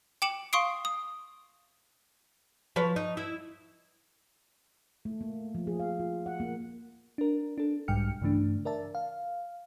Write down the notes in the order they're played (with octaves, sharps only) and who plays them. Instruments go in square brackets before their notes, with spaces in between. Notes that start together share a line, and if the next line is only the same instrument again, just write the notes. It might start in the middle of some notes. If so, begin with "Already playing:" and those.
[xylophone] G5 D6 C#7 E7 F#7
F5 C6 C#6 D#6 C7 D7
D#6
[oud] F3 B4 C#5
D#4
E4
[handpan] A3
A#3
F3
G#4
F5
F4
F#5
A#3
[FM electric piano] D4 A#4
D4 A4
B1 G#2 G3 G5 F6 C#7
G2 C#3 E3 A3 D4
A#4 D5 E5 A5
F5